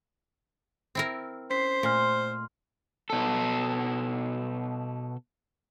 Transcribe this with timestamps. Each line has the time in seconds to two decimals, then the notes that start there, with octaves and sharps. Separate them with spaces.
0.95 C4 E4 A#4
1.50 C#4 C5 B6 C7
1.83 A#2 A3 C6 F6
3.10 B2 A4